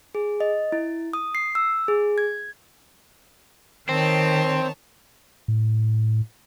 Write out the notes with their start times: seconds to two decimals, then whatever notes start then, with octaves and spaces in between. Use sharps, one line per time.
0.15 G#4
0.40 D#5
0.72 E4
1.13 D#6
1.35 C7
1.55 E6
1.88 G#4
2.18 G#6
3.89 D#3 C4 C#5 A5
5.48 A2